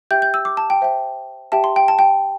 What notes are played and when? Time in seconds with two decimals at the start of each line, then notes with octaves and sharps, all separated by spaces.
0.11 G4 E5 G5 G6
0.22 G6
0.34 E6
0.45 D6
0.57 A5
0.70 G5
0.82 C5 E5 G5
1.52 G4 E5 G5 A5
1.64 C6
1.76 G5
1.88 A5
1.99 G5